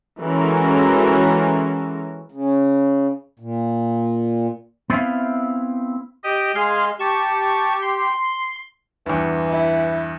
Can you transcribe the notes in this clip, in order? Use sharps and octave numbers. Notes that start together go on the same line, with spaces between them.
E3 G#3 C#4 F#4 A4 A#4
C#3
A#2
B3 C4 E4 E5 F5
G4 D#5
G#3 G#4 F5 C6
G4 A5 C#6
C6
E2 G2 E3
E4